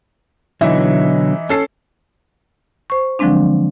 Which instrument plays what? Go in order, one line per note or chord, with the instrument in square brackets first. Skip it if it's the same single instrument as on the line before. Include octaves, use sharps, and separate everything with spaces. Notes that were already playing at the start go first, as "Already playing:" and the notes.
[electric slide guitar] B2 D3 F#3 [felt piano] E3 D#4 E5
[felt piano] C#4 A4 C7
[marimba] C5 C#6
D3 F3 F#3 G#3 C4 D4